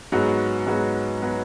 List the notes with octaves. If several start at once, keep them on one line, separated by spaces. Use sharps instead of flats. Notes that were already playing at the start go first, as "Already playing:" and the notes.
G#2 F#3 B3 F#4
G#2 F#3 B3 F#4
F#3 B3 F#4